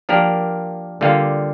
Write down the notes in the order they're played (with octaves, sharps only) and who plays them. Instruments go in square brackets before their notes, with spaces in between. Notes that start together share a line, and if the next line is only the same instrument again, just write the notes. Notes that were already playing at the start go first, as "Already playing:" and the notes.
[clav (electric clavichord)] F3 A#3 D4 G4 A#4
D3 G3 A#3 F4